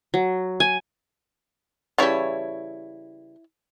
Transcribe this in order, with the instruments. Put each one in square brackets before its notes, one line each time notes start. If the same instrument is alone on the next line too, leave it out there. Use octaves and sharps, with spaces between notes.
[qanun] F#3
G#5
[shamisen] C#3 E3 G3 [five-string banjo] E4 C#5 A5